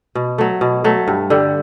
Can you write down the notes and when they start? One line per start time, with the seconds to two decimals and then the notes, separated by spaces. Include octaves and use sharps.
0.15 B2
0.38 F#3 A3
0.61 B2
0.84 F#3 A3
1.08 G2
1.30 D3 G3